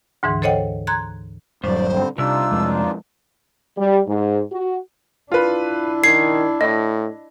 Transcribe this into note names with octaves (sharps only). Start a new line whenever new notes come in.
D2 G#2 D3 E3
A4 C5 C#5 D#5 F#5 G5
A#5 C6 F#6 G#6
D#1 G2 F#3 C5 D5
D3 G3 C4
C2 C3 D4 D#4 F4 E6
F2 G#3
G3
G#2
F#4
D4 E4 F4 B4
D#3 G#6 C7
A2 D#5